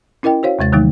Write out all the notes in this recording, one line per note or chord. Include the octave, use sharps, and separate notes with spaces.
C#4 E4 A#4 D#5 G5
F#4 C5 C#5 F5
D#2 C3 G#3 A6
D3 D#3 F#3 G3 A3 D#4